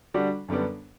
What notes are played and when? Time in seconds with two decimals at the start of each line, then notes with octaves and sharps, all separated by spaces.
0.14 D3 G3 D4 F#4
0.48 F#2 D3 G3 B3 D4